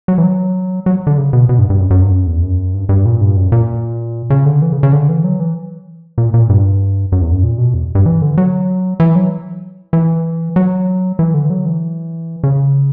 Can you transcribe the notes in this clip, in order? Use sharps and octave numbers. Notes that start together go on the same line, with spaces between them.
F#3
E3
F#3
F#3
D3
C#3
B2
B2
G2
G2
F#2
F#2
G2
F#2
E2
F#2
G2
G2
A#2
G2
F#2
A#2
C#3
D3
E3
C#3
C#3
D3
E3
F#3
E3
A#2
A#2
G2
F#2
E2
F#2
A#2
B2
E2
G2
E3
D3
F#3
E3
F#3
E3
F#3
E3
D3
F#3
E3
C#3